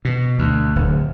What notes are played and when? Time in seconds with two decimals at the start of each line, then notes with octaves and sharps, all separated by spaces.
0.05 B2
0.39 D2
0.76 D1